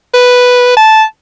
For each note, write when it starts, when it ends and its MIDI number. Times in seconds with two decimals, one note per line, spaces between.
0.14 0.73 71
0.77 1.03 81